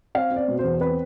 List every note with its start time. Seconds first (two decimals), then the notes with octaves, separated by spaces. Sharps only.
0.15 C4 F5
0.31 C4
0.36 D5
0.48 B2
0.59 C5
0.64 E2
0.81 C4 B4